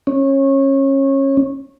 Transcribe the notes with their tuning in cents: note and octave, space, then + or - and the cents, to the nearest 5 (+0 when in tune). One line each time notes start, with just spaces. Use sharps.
C#4 -25